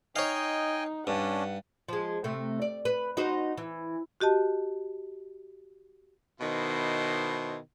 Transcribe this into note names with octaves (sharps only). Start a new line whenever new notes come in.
D#4 C#5 D#5 F5 G5 G#5
G2 C#4 D4 F#5
F3 G#3
C3 A3
D5
B4
D#4 F#4 C5
E3
F#4 G4 D#5 A5
B2 D#3 E4 C5